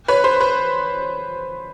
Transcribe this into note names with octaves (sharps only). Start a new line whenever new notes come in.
B4 C#5
C5
B4